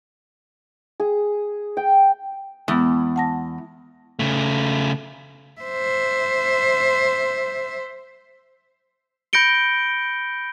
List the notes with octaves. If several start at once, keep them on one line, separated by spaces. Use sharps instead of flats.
G#4
G5
E2 G#3 B3
F#5 A5 A#6
C#3 A3
C5 E5
B5 G6 A#6 C#7 D7 G7